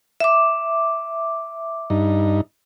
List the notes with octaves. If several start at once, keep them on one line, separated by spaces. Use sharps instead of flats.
E5 D6
G2 D#4